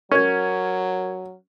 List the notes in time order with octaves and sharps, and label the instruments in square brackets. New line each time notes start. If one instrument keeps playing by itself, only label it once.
[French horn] F#3 [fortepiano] C#4 [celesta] A#4 G#6